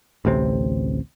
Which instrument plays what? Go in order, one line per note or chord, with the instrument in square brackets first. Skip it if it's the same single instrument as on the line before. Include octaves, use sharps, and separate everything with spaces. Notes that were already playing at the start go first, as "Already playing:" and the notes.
[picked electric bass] A1 D2 C3 C4